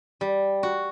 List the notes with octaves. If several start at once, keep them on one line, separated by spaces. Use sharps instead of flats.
G3
F#4